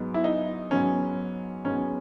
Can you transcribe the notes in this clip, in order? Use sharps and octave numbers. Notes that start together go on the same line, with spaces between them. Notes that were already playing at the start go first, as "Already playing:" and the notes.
Already playing: G#2 F#3 B3
E4
D#4
G#2 F#3 B3 C#4
G#2 F#3 B3 C#4